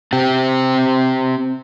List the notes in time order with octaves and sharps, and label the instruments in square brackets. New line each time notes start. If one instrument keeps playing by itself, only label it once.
[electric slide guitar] C4 G4